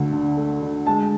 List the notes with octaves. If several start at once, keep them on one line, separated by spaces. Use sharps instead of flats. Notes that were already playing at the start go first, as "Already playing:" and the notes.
Already playing: D2 D3 A3
D4
A3
D3
G#3 A5